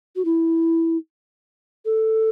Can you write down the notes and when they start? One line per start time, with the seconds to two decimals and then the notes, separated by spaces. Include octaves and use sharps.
0.16 F#4
0.25 E4
1.85 A4